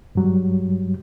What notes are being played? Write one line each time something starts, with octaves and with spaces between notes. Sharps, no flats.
G2 F#3 G3